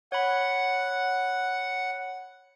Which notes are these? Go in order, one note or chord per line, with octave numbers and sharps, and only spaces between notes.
C#5 F#5 B5